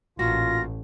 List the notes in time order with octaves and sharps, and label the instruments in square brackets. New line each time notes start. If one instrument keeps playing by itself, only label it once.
[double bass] A1 [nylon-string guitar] A#2 F#4 [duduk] F4 [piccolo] A#6